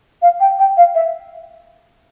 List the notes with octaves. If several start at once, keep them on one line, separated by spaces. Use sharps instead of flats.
F5
G5
G5
F5
E5